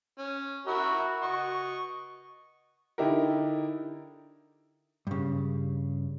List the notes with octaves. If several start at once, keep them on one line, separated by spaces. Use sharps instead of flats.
C#4
F#4 A#4 E5 B5
D#5 C#6
D3 D#4 E4 G4 A#4
G2 C#3